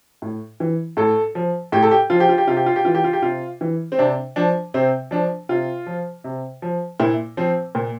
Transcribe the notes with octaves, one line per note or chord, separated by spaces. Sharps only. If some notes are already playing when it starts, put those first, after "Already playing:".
A2
E3
A2 A4
F3
A2 G4
A4
G4
F3 F4
G4
F4
G4
C3 F4
G4
F4
G4
E3 F4
G4
F4
G4
C3 F4
E3
C4
C3 D4
F3 D4
C3 C4
F3 D4
C3 F4
F3
C3
F3
A#2 E4
F3 C4
A#2